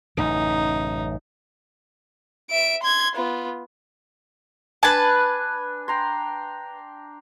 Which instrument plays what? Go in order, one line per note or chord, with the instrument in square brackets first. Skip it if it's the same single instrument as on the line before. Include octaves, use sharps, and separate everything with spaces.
[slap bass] A1 F#2 C#3 [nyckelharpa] D#4
[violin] E5 D7
C6 G#6
B3 F4
[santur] D4 G#5 [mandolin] B4 A5
[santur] G5 A#5 C6